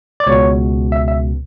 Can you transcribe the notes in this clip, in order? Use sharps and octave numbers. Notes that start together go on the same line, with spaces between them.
D5
C#2 B2 C#5
E5
E5